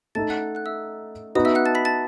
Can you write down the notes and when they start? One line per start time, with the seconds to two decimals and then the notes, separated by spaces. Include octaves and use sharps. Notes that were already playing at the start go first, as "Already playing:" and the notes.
0.15 A3 D#4 A4 A5 A6
0.30 F#5 F#6
0.55 F#5 F#6
0.66 E5 E6
1.35 B3 D#4 F#4 B4 D#5 D#6
1.45 E5 E6
1.55 F#5 F#6
1.65 A5 A6
1.75 B5 B6
1.85 A5 A6